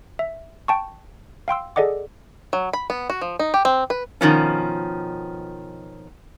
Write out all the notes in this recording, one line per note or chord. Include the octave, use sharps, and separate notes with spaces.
E5
G5 A5 C#6
F5 G5 C6 E6
G#4 A4 D5 D#5 F#5 D6
F#3
B5
B3
F#4
F3
D#4
G4
C4
B4
B2 D#3 F3 C#4